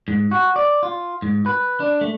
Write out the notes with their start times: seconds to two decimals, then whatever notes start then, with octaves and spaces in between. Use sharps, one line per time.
0.08 G#2
0.31 F#4
0.56 D5
0.83 F4
1.22 G#2
1.46 B4
1.80 D4
2.01 A3